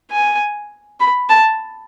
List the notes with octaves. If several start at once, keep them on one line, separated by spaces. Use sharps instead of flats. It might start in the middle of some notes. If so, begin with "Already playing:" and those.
G#5
B5
A5